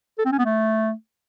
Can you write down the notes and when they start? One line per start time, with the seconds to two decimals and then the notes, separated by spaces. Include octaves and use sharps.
0.19 A4
0.25 C4
0.32 C#4
0.38 B3
0.45 A3